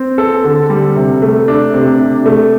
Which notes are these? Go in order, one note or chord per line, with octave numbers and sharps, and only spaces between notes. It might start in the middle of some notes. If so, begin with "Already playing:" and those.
Already playing: C4
A4
D3
G3
C3
A3
D4
C3
C3
A3